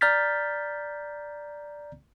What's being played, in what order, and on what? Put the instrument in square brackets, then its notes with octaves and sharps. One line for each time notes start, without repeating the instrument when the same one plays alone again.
[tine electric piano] D5 A#5 F6 G6 A6 B6